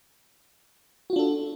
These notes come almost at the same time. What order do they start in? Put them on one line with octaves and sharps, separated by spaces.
F#4 F4 D4 A4